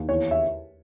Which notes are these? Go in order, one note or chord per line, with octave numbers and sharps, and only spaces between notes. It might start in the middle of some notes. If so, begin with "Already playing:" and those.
Already playing: D#2
E2 C#5
E5